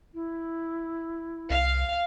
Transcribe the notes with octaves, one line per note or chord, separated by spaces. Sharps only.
E4
C2 F5